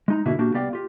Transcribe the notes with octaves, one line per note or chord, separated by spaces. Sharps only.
G#3 D#4 A#5
G#2 B2 D3 A#3 E4 F#4
A#2 A#3 D4 F#4 G4
C2 B3 G4 D5 F5 G5
F4 G4